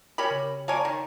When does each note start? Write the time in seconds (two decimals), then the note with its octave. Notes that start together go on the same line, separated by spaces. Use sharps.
0.18 C#4 G4 A#4 C#5 G#5 B5
0.30 C#3
0.68 A#3 C#5 D5 G#5 A5
0.85 D#3